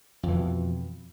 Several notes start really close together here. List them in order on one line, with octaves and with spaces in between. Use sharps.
F2 E3 B2